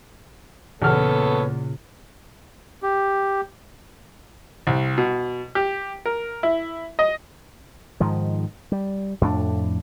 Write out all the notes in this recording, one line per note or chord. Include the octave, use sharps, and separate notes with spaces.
E2 A#2 C#3 B3 A4 C#5 F6
G4
C2
B2
G4
A#4
E4
D#5
G#2 D#3 F3
G3
F2 A2 D4